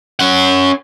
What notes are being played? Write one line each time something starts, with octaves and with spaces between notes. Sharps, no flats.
C#4 F#5